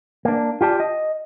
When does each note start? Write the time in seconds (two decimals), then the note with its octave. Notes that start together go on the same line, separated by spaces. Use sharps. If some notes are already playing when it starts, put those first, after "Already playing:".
0.25 A#3 D4
0.61 F4 G4 D5 A5
0.80 D#5